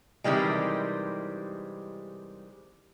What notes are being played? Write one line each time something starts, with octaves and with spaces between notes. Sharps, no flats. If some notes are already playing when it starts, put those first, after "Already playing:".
C3 D#3 E3 G3 G#3